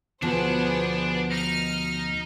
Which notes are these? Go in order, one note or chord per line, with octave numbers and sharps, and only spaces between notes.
D2 B2 F3 B3 D4 G#4 C5
D#4 F6